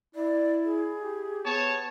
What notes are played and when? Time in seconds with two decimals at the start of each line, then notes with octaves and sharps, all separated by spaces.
0.15 E4 D5
0.64 G#4
0.98 G4
1.46 B3 C#5 A5